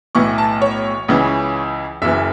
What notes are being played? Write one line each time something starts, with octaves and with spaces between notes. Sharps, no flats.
B1 A2 E3 C#6
A5
C#5
C#2 C#3 E3
F#1 F#2 E3 E5